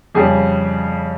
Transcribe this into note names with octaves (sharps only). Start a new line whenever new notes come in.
F2 C#3 G3 G#4